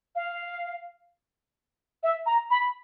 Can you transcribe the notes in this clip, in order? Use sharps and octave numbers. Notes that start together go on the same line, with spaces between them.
F5
E5
A#5
B5